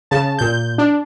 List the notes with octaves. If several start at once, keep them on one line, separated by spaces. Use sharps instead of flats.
C#3 A5
A#2 G6
D4